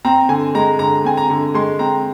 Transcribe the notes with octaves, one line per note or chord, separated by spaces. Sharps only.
C4 A#5
D3 G#5
G#3 A#5
D3 A#5
C4 G#5
A#5
D3
G#3 C6
C4 A#5